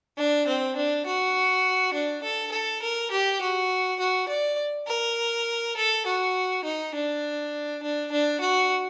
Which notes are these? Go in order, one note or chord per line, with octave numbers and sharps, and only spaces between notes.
D4
C4
D4
F#4
D4
A4
A4
A#4
G4
F#4
F#4
D5
A#4
A4
F#4
D#4
D4
D4
D4
F#4